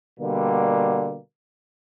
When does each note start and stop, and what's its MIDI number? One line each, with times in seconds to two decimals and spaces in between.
0.19 1.17 47
0.19 1.17 50
0.19 1.17 55
0.19 1.17 58